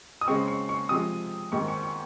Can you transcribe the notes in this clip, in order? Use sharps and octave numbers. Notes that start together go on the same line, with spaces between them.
D#6
C#3 G#3 C4 C#6
C#6
C#6
C3 F3 G#3 D#6
G#2 D#3 G3 C4 C#6
C#6
C#6